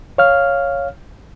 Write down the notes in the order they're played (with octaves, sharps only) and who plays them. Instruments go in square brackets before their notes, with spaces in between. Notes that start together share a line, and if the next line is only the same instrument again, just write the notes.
[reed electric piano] C#5 F5 F6